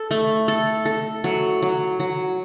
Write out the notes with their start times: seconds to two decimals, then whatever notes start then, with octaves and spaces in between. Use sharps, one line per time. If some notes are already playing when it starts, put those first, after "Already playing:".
Already playing: A4
0.11 A3
0.48 A4
0.86 A4
1.24 F#3
1.62 F#3
2.00 F#3